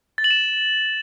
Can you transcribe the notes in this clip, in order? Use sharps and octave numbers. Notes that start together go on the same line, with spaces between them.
A6
F#7
E7